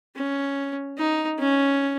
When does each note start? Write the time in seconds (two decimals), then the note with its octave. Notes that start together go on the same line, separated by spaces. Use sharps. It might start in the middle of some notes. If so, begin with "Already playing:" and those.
0.16 C#4
0.98 D#4
1.39 C#4